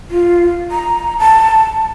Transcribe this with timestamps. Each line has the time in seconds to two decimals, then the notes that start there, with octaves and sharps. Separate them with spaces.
0.10 F4
0.71 A#5
1.19 A5